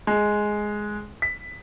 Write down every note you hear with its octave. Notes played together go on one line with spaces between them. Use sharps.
G#3
B6